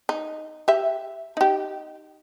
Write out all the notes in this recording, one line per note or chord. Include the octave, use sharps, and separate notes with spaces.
D#4
G4 E5
D#4 G4